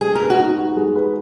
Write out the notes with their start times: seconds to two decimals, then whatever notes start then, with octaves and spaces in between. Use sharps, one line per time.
0.01 G#3 G#4
0.15 A#4 B4
0.30 F#4
0.39 D#4
0.58 F#4
0.77 G#3
0.96 B4